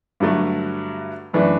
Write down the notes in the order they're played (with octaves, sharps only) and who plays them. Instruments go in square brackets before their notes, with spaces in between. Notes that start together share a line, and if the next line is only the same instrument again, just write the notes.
[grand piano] G2 D3 F#3 A3
F#2 E3 A3 D4